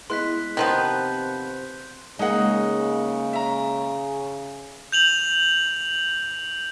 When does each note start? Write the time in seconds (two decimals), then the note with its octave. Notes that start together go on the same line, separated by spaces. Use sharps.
0.10 G#3 B3 E4 C6 F#6 B6
0.57 C3 D#3 F3 B3 G6
2.19 C#3 G#3 A#3 D#4 F#5
3.33 E5 A#5
4.92 G6 F7 F#7